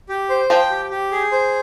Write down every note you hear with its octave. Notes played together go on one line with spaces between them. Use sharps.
G4
C5
F3 G5
G4
G4
G#4
C5